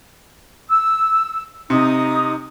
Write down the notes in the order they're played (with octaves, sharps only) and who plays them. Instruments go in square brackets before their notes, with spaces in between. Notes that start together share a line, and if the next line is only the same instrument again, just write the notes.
[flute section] E6
[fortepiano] C3 [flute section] D#4 D#6